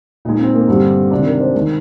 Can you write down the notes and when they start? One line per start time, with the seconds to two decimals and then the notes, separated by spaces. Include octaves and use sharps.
0.25 A#2 G#3 D#4
0.39 C4
0.54 A#3
0.67 G2 D3 G3 C4
1.11 C3 D#3 G#3 D4
1.26 A#4
1.40 C5
1.54 D#3 G#3 A#4